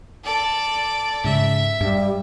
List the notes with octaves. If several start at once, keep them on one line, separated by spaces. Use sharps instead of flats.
A4 D5
G#2 C#3 E5
G2 G3